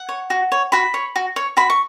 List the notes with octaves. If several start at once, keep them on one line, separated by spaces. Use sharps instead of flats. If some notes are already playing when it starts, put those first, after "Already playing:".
Already playing: F#5
C#5
F#4
C#5
F#4 B5
C#5
F#4
C#5
F#4 B5
C#6